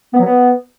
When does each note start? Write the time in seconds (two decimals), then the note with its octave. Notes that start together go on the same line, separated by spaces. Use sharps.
0.14 B3
0.20 F#3
0.26 B3